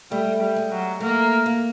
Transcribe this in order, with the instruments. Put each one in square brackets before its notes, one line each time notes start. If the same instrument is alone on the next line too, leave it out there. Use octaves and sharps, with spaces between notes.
[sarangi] G3 [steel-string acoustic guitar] A3
[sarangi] G3
[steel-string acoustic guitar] G#3
[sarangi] F#3
[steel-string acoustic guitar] A3 [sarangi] A#3
[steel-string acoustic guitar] A#3